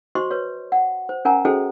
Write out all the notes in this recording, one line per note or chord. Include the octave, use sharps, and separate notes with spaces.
F#4 C5 D#5 C6 C#6
B4 C#5
F#5
C5
C#4 A#4 F#5 G#5 A#5
C#4 F#4 G#4 A4 C5 D#5